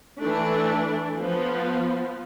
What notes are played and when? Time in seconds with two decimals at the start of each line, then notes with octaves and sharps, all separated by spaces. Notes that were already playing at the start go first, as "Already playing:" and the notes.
0.18 E3 A3 D4
1.19 F3 B3